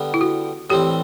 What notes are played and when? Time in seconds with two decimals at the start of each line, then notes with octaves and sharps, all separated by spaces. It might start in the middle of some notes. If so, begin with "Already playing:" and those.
Already playing: D3 G3 B3
0.14 E4
0.21 F#4
0.70 A2 E3 G3 C4 G4